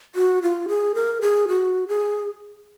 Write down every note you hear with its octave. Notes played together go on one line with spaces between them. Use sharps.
F#4
F4
G#4
A#4
G#4
F#4
G#4